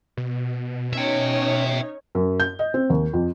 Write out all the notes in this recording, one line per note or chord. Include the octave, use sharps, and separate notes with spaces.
B2
C#4 D#4 C#5 E5 G5
F#2
G6
D#5
C4
D#2
F2